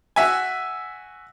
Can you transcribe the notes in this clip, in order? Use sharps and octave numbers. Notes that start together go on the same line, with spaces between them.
F#4 E5 G#5